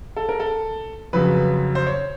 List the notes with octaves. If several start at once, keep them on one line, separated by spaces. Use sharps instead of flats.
A4
A#4
A4
F2 C#3 F#3 B4
C5
C#5